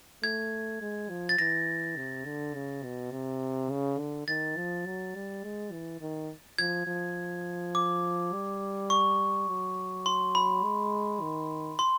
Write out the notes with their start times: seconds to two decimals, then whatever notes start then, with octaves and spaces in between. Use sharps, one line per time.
0.23 A3 G#6
0.81 G#3
1.09 F3
1.29 A6
1.39 E3 A#6
1.96 C3
2.25 D3
2.54 C#3
2.84 B2
3.12 C3
3.70 C#3
3.99 D3
4.28 D#3 A6
4.57 F3
4.86 F#3
5.15 G3
5.44 G#3
5.72 E3
6.01 D#3
6.58 F3 G#6
6.87 F3
7.75 D6
8.33 G3
8.90 C#6
9.49 F#3
10.06 C6
10.35 B5
10.63 G#3
11.21 D#3
11.79 C6